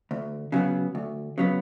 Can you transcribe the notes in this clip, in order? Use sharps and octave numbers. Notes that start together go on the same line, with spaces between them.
D2
C#3 F#3 B3
D2
C#3 F#3 B3